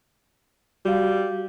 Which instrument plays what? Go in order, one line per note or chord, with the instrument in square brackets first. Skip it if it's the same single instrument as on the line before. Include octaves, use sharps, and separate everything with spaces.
[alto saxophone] G3 [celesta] F#4 F5